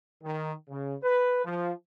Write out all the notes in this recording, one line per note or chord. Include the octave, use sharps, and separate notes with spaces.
D#3
C#3
B4
F3